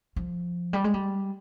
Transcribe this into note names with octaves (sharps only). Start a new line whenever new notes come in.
F3
G3
G#3
G3